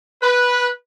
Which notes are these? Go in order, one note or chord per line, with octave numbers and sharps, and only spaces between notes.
B4